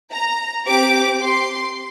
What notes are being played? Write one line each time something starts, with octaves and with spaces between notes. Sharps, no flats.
A#5
C4 G4 D6
C6